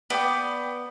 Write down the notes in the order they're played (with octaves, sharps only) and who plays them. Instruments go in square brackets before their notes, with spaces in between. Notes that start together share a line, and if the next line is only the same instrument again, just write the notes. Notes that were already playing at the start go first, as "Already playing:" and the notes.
[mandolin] B3 [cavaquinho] D5 G5 D6